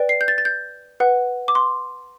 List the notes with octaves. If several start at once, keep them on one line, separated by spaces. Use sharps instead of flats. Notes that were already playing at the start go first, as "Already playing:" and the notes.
Already playing: B4 D5 G5
C7
G6
A6
A6
G6
B4 F#5
D6
C6